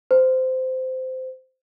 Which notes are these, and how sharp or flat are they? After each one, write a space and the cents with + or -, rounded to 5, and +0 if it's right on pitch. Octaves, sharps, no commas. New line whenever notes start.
C5 -15